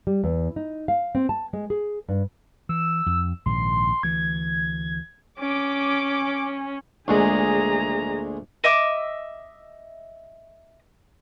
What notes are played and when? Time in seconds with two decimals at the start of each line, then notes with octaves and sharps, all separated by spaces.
0.07 G3
0.24 E2
0.56 D#4
0.88 F5
1.15 C4
1.29 A5
1.53 G#3
1.70 G#4
2.09 G2
2.69 E3 E6
3.06 F2
3.46 A#1 G#2 D#3 C6
4.03 D2 E3 G#6
5.40 C#4 D6
7.08 D2 A#2 G#3 G#4 A#5
8.64 D#5 E5 D6